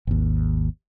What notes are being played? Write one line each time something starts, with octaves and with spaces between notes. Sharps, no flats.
G#1 D#2